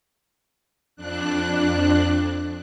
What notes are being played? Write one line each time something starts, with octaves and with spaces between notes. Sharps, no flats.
F2 D4 F#6